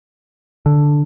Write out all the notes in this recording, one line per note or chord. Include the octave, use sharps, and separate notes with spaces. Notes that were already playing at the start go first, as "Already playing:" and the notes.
D3